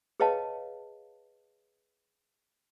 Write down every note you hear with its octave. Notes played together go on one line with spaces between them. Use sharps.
G#4 B4 C#5 D#5 F5 A5